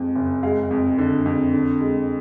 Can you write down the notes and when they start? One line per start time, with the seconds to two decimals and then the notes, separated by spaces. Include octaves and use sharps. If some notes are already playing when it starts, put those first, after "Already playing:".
Already playing: F2 F3 G#3
0.15 F#1
0.43 G#3 F5
0.71 F2
0.98 D3
1.26 F2
1.53 D3
1.80 G#3